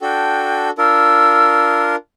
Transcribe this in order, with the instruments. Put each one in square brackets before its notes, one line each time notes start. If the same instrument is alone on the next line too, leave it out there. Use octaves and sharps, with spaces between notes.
[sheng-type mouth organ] D4 F#4 A4 [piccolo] G5
[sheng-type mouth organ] D4 F4 A#4 [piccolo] E6